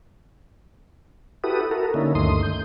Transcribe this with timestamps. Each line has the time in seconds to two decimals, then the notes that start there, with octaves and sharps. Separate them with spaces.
1.44 E4 F#4 G4 A4 B4 D#6
1.71 F#4 A4 A#4
1.94 D3 A#3 C#4 D#4 E4
2.15 D2 G2 D#3 A3 C6 D#6
2.43 G6